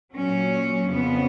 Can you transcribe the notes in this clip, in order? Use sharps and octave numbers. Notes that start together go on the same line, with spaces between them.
A#2 F#3 C#4
F2 C#3 F3 B3